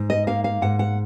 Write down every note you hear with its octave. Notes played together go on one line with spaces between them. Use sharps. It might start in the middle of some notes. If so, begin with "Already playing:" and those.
Already playing: G#2
D#5
A#3 F5
F5
G#2 F#5
F#5